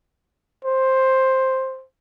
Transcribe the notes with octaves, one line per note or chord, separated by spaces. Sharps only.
C5